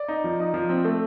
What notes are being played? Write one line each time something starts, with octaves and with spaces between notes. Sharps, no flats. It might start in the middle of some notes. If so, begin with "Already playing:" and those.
Already playing: D5
D#4
F3
D#4
F3
C4
A3